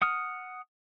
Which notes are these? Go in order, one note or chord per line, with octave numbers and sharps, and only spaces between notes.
F#5 D#6 F6